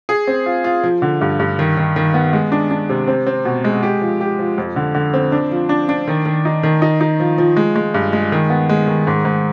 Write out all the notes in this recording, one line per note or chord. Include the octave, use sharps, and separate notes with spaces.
G#4
C4
F4
F4
F3
D3
G2
G2
D#3
D#3
D#3
B3
G#3
D4
D4
C3
C4
C4
B2
G#3
G4
F3
G4
F3
F2
D3
D3
C4
D4
F3
D4
D4
D#3
D#3
D#4
D#3
D#4
D#4
F3
F3
G#3
G#3
G2
G#3
D#3
B3
G#3
D#3
G#2
G#2